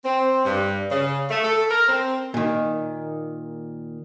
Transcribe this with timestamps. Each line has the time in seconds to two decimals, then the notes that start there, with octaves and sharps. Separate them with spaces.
0.05 C4
0.44 G2
0.90 C#3
1.29 A3
1.43 A4
1.70 A#4
1.88 C4
2.34 A#2 D#3